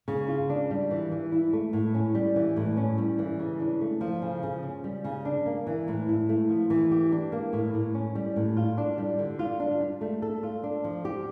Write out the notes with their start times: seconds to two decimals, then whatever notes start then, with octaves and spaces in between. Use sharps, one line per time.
0.08 C#3
0.28 F4
0.50 D4
0.71 G3
0.91 E3
1.12 E3
1.32 E4
1.53 A3
1.73 A2
1.94 C#4
2.15 G3
2.36 E3
2.57 A2
2.77 C#4
2.98 G3
3.19 E3
3.39 C#3
3.60 D4
3.81 A3
4.01 F3
4.22 C#3
4.43 C#3
4.63 C#4
4.84 G3
5.04 C#3
5.25 D4
5.46 A#3
5.67 E3
5.88 A2
6.09 E4
6.29 A3
6.49 F3
6.70 E3
6.91 G4
7.12 D4
7.32 A#3
7.53 A2
7.74 A2
7.94 C#4
8.15 G3
8.36 A2
8.57 F4
8.78 D4
8.98 G3
9.19 D3
9.39 F4
9.60 D4
9.80 G3
10.01 A3
10.22 A4
10.43 F4
10.64 D4
10.84 F3
11.05 G4